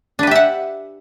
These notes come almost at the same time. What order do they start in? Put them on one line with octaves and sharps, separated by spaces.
D4 B4 G4 E5 F#5